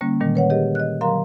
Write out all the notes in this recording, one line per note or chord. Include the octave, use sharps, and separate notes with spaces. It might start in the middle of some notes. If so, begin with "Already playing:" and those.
D3 G3 A#3 C#4
A#2 D#3 G3 G#3
B4 C#5 F#5
G4 G#4 A#4 D#5
D#5 F#6
D3 F#3 A#4 F5 A#5 C6